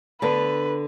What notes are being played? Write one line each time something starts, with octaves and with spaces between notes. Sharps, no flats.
D3 B3 D4 B4